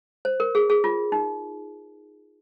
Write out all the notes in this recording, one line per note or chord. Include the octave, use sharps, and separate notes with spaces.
C5
A#4
G#4
G#4
F4
D#4